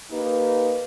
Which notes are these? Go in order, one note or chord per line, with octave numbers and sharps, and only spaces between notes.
A#3 D#4 G4 B4